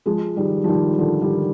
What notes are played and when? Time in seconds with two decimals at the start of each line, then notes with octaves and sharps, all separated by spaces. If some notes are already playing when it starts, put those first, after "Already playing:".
0.06 F3 G#3
0.37 D#3 G3
0.64 F3
0.67 D#3 G3
0.98 D3 F3
1.22 D#3 G3